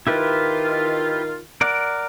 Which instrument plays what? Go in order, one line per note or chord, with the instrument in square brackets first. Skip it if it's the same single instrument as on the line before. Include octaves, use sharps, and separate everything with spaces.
[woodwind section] D#3 F4 [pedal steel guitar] E4 G4 B4
[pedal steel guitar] A#4 D5 F#5